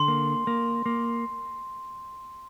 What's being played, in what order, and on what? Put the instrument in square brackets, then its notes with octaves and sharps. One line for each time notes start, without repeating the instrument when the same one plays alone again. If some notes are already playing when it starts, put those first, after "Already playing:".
Already playing: [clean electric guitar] D3 [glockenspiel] C6
[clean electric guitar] A#3
A#3
A#3